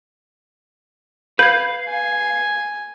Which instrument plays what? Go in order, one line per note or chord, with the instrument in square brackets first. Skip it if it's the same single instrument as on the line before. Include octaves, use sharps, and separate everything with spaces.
[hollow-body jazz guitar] B4 [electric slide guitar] F5 [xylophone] G6 G#6
[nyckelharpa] G#5